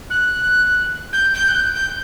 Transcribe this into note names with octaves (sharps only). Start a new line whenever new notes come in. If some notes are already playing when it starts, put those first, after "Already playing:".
F#6
G6
G6
F#6
G6
G6